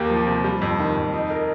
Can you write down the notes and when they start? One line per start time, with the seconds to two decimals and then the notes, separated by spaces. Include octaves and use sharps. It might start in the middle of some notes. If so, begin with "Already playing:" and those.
Already playing: D#2 A#3 G4
0.10 F3
0.27 C3
0.44 G3
0.62 F2
0.79 D#3
0.96 F2
1.14 D#4
1.30 A#4